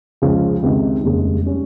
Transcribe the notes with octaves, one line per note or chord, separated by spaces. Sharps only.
C#2 C#3 F3
C#2 C3 D#3
F1 D#2 C#3 G#3
G3 C#4